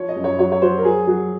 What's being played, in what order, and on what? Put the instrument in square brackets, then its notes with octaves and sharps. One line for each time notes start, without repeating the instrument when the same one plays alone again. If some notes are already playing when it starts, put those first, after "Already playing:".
Already playing: [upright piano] F3 C#5
D#5
F#2
C#5
F#3 C#5
C#5
F#3 C5
A#4
F#3 G#4
F#3